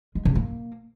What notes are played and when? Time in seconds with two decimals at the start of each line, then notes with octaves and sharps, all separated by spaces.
0.15 G#3
0.25 C#3
0.35 A#3